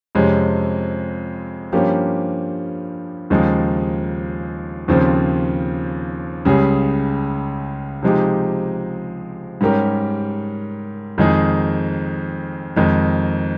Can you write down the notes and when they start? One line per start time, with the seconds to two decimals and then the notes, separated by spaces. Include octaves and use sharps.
0.15 F2 C3 F3 G#3 C#4
1.73 G2 F3 A#3 C#4 G4
3.30 D#2 C#3 F3 G#3 D#4
4.88 D#2 C#3 F3 C4
6.45 C#2 C#3 G3 C#4 G#4
8.03 C3 F3 G#3 D#4 G4
9.61 G#2 G3 C#4 G4 A#4
11.18 F2 D#3 G#3 D#4 G#4
12.76 F2 D#3 G#3 D#4